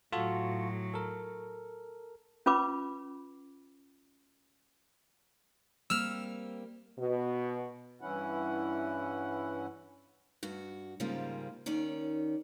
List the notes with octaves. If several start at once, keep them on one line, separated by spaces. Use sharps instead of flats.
A2 F#3 F4 F#4 A4
A4 A#4
C#4 F4 B4 B5 D6
G3 A#3 C4 E6 F6
B2
G2 E3 C#4 E4 F#5
G2 F#4
G#2 C#3 F3 G3 G#3 A#3
D#2 D#3 C#4 D5